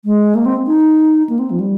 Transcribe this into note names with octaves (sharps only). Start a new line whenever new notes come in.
G#3
A#3
C4
D#4
A#3
C4
F3
G3